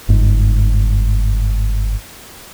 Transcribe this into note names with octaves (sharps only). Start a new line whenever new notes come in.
G1 G#2